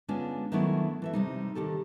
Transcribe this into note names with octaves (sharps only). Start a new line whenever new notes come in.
D3 G#3 B3 C#4 D4 F4
D#3 F#3 A3 B3 D4 E4
E3 A4 E5
C3 G3 D#4
D3 D#3 G4 A4